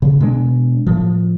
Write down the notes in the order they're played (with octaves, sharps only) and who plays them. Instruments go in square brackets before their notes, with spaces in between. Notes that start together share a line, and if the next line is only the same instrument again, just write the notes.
[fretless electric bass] C#3
B2 G#3 D4
A2 F3